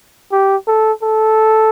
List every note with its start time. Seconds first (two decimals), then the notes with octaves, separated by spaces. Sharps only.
0.32 G4
0.67 A4
1.03 A4